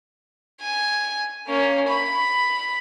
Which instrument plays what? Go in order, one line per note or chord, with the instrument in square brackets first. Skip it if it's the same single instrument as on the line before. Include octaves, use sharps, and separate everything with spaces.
[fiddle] G#5
A#3 C#4
B5